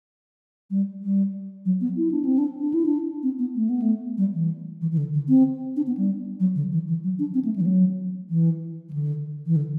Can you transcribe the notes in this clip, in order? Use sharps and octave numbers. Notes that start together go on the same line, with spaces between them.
G3
G3
F#3
B3
E4
D4
C4
D4
D4
E4
D4
C4
B3
A3
B3
A3
G3
E3
E3
E3
D3
D3
C4
D4
B3
G3
F#3
D3
E3
E3
F#3
D4
C4
A3
G3
E3
F#3
E3
E3
D3
E3
D3